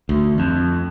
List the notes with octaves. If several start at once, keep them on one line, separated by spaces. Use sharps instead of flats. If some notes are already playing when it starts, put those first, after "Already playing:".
D2
F2